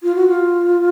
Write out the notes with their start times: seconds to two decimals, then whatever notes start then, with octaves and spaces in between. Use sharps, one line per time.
0.03 F4
0.15 F#4
0.27 F4